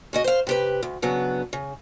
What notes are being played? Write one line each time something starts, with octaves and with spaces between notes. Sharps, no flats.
C#3 F#4 D#5
C5 F5
C3 G4 B4
D2
C#3 F#3 B3 D4
C#3